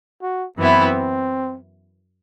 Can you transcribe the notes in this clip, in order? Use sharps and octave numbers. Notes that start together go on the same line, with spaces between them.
F#4
F#2 E3 B3 C4 E4